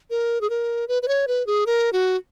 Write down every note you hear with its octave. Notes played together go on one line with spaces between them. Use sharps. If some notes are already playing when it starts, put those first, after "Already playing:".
A#4
G#4
A#4
B4
B4
C#5
B4
G#4
A#4
F#4